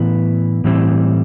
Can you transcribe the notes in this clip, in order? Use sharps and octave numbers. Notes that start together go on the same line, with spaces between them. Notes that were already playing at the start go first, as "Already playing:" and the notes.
Already playing: A2 E3 B3 E4 B4
A2 E3 G3 C4 E4